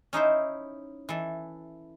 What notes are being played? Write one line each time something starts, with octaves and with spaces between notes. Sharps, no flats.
C#4 D#4 E4 C5
E3 A4